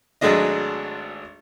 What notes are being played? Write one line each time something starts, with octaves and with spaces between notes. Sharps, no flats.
G#1 F#3 G#3 A3 D4 D#5